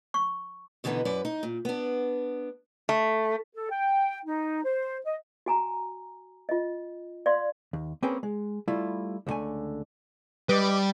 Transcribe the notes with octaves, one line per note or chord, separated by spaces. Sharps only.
C#6
B2 D3 E3 B3 D#4
F#2 B4 D5
D#4
A#2
B3 D4
A3
A4
G5
D#4
C5
D#5
F#4 G#5 A#5
F4 D#5
D5 F5 C6
D#2
A#3 C4 C#4 G#4 B4 G5
G#3
G3 A3 E4 F4
C#2 A#2 D3 A3 G#5
G3 B4 D#5 D6